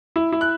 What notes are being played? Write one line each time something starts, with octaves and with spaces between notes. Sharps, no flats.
E4
E4
F#6